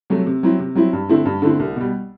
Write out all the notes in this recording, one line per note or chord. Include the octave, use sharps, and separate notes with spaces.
C3 F#3 A3
C3
F#3 C4 E4
C3
F#3 C4 E4
G2
D3 A3 C4 E4
G2
D3 A3 C4 E4
C2
B2 G3